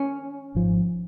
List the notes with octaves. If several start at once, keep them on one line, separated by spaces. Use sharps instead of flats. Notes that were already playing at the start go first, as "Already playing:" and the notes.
Already playing: C#4
G#1 G#2 F3